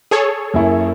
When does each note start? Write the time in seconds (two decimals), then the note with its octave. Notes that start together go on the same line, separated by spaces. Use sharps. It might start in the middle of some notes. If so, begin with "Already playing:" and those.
0.11 G#4 A4 C#5
0.54 F#2 A#3 E4